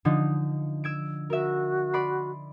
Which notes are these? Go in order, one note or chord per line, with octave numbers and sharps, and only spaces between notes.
D3 F3 D#4
E6 G#6 D7
F#4 A#4 E5
D5 B5 C6